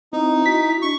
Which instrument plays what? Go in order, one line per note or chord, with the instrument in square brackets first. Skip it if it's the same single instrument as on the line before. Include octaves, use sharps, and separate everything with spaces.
[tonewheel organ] C4 E4 [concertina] D#4 [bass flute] D#5
[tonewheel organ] E4 [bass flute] F#4 [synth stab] B6
[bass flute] D4 [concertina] C#6